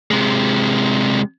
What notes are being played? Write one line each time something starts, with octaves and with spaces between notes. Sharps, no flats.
C3 G#3